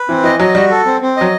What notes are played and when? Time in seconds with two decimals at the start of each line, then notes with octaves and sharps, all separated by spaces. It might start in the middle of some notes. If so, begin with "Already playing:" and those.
Already playing: B4
0.09 E3 C4
0.24 E3 D#5
0.39 F#3 D#5
0.55 G3 F#4
0.70 A4
0.86 C4
1.01 C4
1.17 F#3 D#5